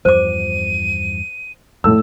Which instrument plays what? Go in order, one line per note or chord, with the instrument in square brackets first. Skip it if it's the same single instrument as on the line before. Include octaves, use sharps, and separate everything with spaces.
[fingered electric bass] E2 G2 F3 [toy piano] C5 D6 [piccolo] D#7
[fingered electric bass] F2 [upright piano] A2 A4 E6